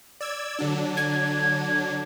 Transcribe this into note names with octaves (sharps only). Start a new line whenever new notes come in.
D5 E6 G#6
D3 F#3 D4
G#6